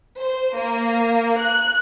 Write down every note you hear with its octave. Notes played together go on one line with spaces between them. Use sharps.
C5
A#3
F#6